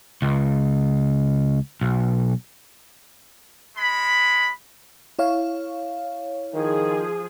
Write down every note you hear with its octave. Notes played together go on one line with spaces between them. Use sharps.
C#2
B1
G#3 B5
E4 C#5 F5
D#3 F3 G#4